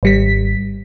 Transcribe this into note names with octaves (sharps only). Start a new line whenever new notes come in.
G#1 G3 B6